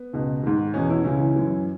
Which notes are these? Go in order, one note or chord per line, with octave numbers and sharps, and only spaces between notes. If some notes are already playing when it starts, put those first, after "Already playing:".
Already playing: B3
C#2 B2
G#2 D#3
E2 B2 C#4
C#4 E4
C#2 C#3 E3 C#4 E4
F#2 E3